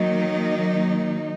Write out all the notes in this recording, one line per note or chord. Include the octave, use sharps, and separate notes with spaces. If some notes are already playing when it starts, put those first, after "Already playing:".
Already playing: D#3 F#3 A#3 D#4